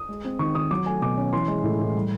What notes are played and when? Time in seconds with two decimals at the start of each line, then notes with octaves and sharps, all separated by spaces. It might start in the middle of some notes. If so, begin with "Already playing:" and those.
Already playing: D#6
0.09 G#3
0.25 C4
0.39 D#3 C#6
0.55 D#3 D#6
0.71 F#3 D6
0.86 A3 G#5
1.02 B2 D6
1.17 C#4
1.33 E3 C6
1.48 G#3
1.64 A2
1.79 A2
1.95 G3